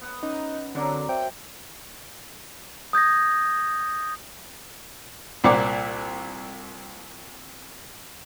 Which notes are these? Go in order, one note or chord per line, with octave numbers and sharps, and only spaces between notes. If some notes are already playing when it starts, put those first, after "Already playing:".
B3 F#5
C#4 D#4
D3 F#3 C4 A#4 D5 D6
C5 E5 G5
D#6 G6 G#6 A#6
C2 A#2 C5 F#5 D6